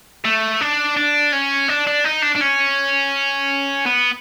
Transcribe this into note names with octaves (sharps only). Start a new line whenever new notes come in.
A3
D4
D4
C#4
D4
D4
D#4
D4
D4
C#4
B3